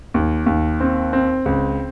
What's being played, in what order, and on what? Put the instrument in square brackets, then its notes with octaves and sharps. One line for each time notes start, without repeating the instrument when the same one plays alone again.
[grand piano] D#2
D#2
C4
C4
C#2